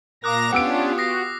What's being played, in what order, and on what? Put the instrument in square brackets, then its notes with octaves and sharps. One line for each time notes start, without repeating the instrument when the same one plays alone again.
[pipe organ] A#2 A#5 A#6 [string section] A#4 F5 [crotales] D6 D#6 F#6
[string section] B3 F4 G4 [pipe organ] C#4 D4 [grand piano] F#5 E6 D7
[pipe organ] F#4 [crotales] D#6 A#6 C7